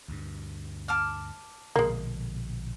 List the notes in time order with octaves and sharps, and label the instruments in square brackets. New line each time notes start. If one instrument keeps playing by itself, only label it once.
[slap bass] D2 G2
[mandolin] A5 D6 F6
[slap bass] A#1 B2 D3 [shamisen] G#3 A#3